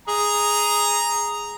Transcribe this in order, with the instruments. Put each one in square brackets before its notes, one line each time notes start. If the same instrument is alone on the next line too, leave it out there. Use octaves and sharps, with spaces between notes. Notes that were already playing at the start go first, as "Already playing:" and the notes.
[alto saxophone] G#4 [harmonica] A#5